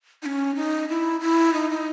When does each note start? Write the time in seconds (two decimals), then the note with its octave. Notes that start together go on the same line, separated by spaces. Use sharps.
0.22 D#4
0.26 C#4
0.55 D#4
0.88 E4
1.20 E4
1.53 D#4
1.70 D#4